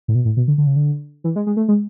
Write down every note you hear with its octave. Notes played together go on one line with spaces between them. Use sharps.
A2
B2
A2
B2
D3
D3
C#3
D3
E3
G#3
G#3
A3
G#3